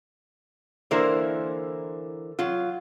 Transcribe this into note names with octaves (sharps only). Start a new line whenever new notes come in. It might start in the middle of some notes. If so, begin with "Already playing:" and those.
D3 E3 A#3 E4 A#4 C5
F#3 F4